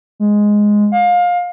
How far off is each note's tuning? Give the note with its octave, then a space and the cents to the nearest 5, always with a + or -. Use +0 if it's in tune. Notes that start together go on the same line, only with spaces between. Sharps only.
G#3 +0
F5 +25